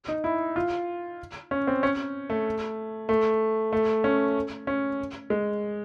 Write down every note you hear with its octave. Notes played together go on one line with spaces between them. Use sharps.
D#4
E4
F4
C#4
C4
C#4
A3
A3
A3
C#4
C#4
G#3